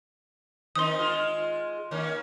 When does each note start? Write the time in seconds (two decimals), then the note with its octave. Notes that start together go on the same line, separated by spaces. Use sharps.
0.76 D#3 C4 D#4 C6 D#6
0.99 G#3 F4
1.91 D#3 A#3 C#4